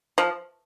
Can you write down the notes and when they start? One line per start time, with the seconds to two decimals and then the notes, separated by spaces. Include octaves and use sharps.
0.18 F3